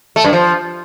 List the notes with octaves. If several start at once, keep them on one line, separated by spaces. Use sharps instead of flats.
A3
G2
F3